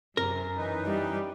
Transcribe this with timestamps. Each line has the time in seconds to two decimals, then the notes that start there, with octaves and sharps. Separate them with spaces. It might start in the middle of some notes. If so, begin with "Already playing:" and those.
0.17 F#2 C3 A#4
0.57 E3 D#4 B4
0.87 G3